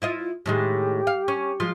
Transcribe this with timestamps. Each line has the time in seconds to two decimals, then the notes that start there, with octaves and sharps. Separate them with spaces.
0.02 E4 F4 D#5
0.46 A2 D#3 G#3 G4
1.07 F5
1.28 C#4
1.60 F3 G#3 F4